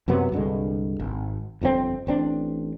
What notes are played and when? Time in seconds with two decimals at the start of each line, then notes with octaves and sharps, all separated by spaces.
0.08 F#2 C3 F#3 B3
0.32 C2 G2 D3 G#3
1.00 G#1
1.61 G1 F2 A#2 C4
2.07 A1 C4 D4